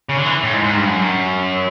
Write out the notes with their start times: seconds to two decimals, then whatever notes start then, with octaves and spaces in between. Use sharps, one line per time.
0.09 C#3
0.17 D3
0.26 E3
0.44 A2
0.53 G#2
0.64 G#2
0.76 G2
0.88 F#2